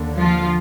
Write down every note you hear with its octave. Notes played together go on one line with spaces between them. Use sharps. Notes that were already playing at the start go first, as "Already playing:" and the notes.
Already playing: D#2 D3
F3 F4